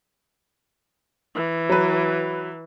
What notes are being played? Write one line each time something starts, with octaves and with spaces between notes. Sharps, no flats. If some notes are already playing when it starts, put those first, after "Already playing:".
E3
F#3 B4